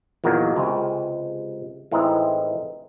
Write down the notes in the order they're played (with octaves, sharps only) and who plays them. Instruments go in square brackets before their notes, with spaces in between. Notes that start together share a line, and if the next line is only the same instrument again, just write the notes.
[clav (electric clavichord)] E2 A#2 D#3 F#3 A#3
C#2 C3 G#3
A2 E3 G#3 C4 D#4